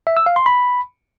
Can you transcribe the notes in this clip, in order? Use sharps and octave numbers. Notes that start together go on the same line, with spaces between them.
E5
E6
F5
C6
B5